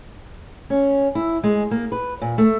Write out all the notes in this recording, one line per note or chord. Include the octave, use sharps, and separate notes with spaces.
C#4
E4
G#3
A#3
B4
A#2
A3